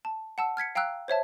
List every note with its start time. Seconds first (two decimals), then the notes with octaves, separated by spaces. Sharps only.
0.05 A5
0.38 F#5 A5 E6
0.57 F6 G#6 B6 C#7
0.75 F5 G5 A#5 E6 F#6
1.08 C5 C#5 E5 A5